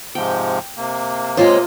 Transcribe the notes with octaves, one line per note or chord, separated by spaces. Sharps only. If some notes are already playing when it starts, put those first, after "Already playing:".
G#2 C3 F3 G5
C3 A#3
G#3 C4 F4 C5 C#5 D#5